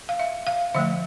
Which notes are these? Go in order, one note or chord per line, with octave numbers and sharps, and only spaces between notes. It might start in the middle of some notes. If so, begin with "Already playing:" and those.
F5
E5
F5
D3 F3 A3 E5